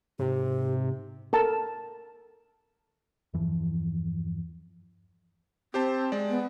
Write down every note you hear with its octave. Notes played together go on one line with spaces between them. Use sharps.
G#2 C3 G4
A4 A#4 A5
E2 G2 E3 F3
C4 G4 C5 A5
G#3 D5
B3